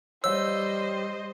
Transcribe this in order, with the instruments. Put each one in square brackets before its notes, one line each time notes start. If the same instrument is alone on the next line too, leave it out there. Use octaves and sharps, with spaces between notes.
[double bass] G3 [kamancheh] C5 D#5 [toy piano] C#5 F5 [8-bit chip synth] E6